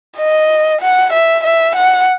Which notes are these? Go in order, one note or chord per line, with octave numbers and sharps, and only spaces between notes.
D#5
F#5
E5
E5
F#5